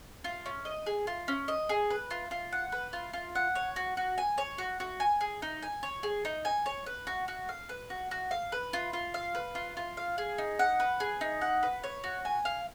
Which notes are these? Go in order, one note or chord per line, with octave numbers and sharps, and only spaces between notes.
F4
C#4
D#5
G#4
F4
C#4
D#5
G#4
B4
F4
F4
F#5
B4
F4
F4
F#5
C#5
F#4
F#4
G#5
C#5
F#4
F#4
G#5
G#4
D#4
G#5
C#5
G#4
D#4
G#5
C#5
B4
F#4
F#4
F5
B4
F#4
F#4
F5
B4
F4
F4
F5
B4
F4
F4
F5
G#4
D#4
F#5
B4
G#4
D#4
F#5
B4
C#5
F#4
G#5
F5